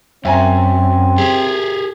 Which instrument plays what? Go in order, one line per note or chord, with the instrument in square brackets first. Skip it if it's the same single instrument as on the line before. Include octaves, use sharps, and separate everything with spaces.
[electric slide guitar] F#2 [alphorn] C4 [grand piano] E5 G#5 A#5
[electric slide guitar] G4 G#4